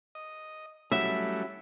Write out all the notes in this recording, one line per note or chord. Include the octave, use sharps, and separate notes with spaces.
D#5
F#3 G3 A3 C#4 E4 F#4 E5